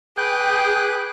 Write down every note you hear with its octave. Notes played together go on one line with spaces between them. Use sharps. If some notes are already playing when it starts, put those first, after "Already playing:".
G#4 B4 G5 D6 F#6